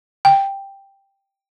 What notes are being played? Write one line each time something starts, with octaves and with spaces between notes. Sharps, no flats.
G5